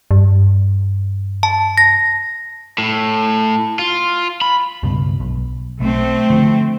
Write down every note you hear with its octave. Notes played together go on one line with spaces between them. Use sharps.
G2
A5
A#6
A2
F4
B5
C#2 G2 B2
B1
B1 A3 C4
D3 F3